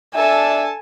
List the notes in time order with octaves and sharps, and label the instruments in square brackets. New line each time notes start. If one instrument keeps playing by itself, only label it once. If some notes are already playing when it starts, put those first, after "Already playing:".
[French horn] D4 [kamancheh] A4 A5 [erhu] E5 [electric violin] G#5